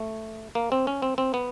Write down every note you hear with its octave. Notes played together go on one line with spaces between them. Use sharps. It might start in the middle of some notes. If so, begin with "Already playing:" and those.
Already playing: A3
A#3
C4
C#4
C4
C4
B3